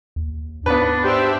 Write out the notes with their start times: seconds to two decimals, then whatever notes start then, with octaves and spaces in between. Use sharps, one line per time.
0.16 D#2
0.66 G#2 B3 D4 B4
1.04 D4 G4 C5 E5